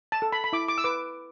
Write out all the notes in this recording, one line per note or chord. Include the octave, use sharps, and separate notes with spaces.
A5
A4
B5
B5
E4 D6
D6
E6
B4 D6